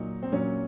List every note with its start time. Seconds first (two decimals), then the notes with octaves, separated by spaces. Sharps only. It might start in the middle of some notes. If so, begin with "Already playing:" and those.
Already playing: A#2 F#3 D#4
0.23 C4
0.32 A#2 F#3 C#4